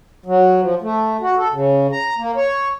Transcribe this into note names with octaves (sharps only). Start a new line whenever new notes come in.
F#3
F3
A3
F#4
A4
C#3
A#5
A#3
C#5